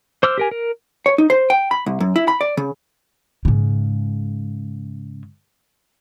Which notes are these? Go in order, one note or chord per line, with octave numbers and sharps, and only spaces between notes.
C5 D6 E6 F6
G4 A#4 G#5
A#4
C#5
D#4
C5
G5
B5
C2
F#2
E4
B5
D5
C#3
G#2 C#3